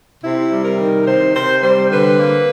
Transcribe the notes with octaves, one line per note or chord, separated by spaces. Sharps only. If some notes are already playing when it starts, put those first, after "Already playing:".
C3 E4
G3
A#4
D#3
C3 C5
C3 C5
G3 C5
D3 B4
A#3